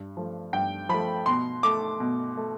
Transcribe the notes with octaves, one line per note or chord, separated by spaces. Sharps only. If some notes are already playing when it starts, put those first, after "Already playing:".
Already playing: G2
F3 A3
G2 G5
F3 A3 B5
B2 C6
A3 D6
B2
A3